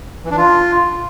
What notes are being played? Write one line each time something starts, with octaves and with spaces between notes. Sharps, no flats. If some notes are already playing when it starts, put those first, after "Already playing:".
E3
D4
F4